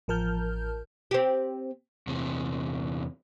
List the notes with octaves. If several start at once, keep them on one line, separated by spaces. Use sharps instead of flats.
A1 F3 A#4 A5 F6 G6
C4 G4
E2 C3